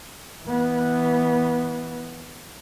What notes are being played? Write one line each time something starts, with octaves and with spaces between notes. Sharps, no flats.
E3 B3